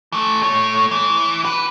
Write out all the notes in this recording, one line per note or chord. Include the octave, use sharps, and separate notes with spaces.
E3 A3
A3 C#5
E3
B4